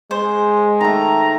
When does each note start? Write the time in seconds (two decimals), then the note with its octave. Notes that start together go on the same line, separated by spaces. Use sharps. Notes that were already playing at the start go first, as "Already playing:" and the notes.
0.11 G#3 C5
0.81 D#3 A3 A#5